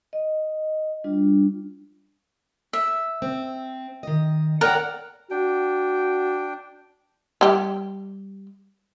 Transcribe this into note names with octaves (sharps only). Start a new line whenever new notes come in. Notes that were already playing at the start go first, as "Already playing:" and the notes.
D#5
G3 D4 F4
E5
C4
D#3 D#5
A#4 C#5 D5 F#5 G5
D4 F#4 G5
G3 G4